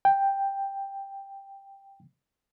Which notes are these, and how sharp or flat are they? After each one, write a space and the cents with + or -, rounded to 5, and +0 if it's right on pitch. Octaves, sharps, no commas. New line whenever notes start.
G5 +5